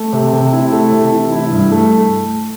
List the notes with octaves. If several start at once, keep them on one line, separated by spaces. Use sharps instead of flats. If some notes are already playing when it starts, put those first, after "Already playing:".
Already playing: A3
C3
C3
E4
A3
C3
E3
E4
G2
A3